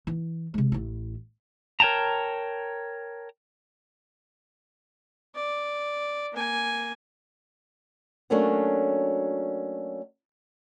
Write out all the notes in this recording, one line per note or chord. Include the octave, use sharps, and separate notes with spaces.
E3
C3 G#3
A1 E4
A#4 C#5 G5 A5 A#5
D5
A#3 G#5
F#3 A3 A#3 C#4 D4 F#4